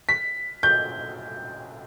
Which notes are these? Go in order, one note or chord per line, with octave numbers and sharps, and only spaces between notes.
B6
G6